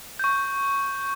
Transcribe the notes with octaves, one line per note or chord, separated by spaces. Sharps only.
C#6 G6